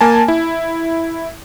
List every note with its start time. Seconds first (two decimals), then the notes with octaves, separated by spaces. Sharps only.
0.01 A#3 G#5 A5
0.28 E4